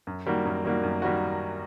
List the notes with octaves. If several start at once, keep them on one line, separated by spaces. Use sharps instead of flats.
F#2
D#3 G3 A#3 F#4
F#2
D#3 G3 A#3 F#4
F#2
D#3 G3 A#3 F#4